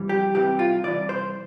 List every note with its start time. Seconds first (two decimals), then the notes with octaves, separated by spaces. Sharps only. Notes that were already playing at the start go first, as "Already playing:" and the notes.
Already playing: F2 E3 G3
0.09 G4
0.34 C2 C3 E3 G4
0.59 F4
0.84 C2 C3 E3 D5
1.09 C5